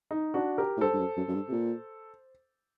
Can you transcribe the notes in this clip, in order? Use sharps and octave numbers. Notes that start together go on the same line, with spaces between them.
D#4
D4 F#4
G4 A#4
A2
G2 A4 C5
G2
F#2
F#2
F#2
G2
C3
A#2